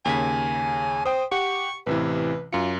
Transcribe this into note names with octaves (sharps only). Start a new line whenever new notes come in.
D#2 C#3 G#5 B6
C5 G5 D#6
G4 F#5 C#6
A1 C3 E3 B4
F#2 F4 C#7